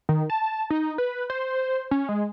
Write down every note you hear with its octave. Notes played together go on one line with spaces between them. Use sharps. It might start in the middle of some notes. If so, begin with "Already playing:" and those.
D#3
A5
D#4
B4
C5
C#4
G#3